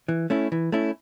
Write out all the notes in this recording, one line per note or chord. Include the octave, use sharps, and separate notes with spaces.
E3
A3 C#4 E4
E3
A3 C#4 E4